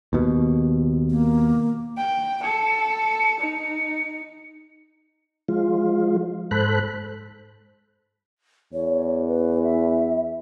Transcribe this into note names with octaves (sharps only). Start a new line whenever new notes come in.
D#2 B2
A#3
G5
A4 C#7
D#4
F3 G#3 F4
G#2 A4 C5 B5 F#6
E2 C#5
B4
E5